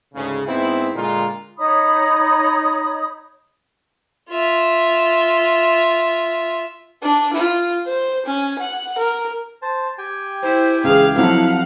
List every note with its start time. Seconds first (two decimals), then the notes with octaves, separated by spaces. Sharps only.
0.14 D2 G#2 C#3
0.46 G#2 B3 C4 E4
0.94 A#2 D3 G#3 F4 A#4
1.57 D#4 C#5 B5 D#6
4.29 F4 E5
7.02 D4
7.33 F4
7.86 C5
8.26 C#4
8.59 F#5
8.98 A#4
9.62 C5 A5
9.98 G4 G5 G#5
10.43 E4 C5
10.84 C#2 E3 G#4 F5
11.16 F2 F3 F#3 E4 F5 F#5